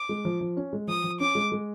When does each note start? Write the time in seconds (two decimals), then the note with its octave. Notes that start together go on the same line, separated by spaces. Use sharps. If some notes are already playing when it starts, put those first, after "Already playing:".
Already playing: D6
0.09 G#3
0.25 F3
0.41 F3
0.57 C#4
0.73 G#3
0.88 F3 D#6
1.04 F3
1.20 C#4 D6
1.35 G#3
1.52 G#3